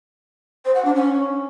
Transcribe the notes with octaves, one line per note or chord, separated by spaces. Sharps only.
C5
F#5
D4
C#4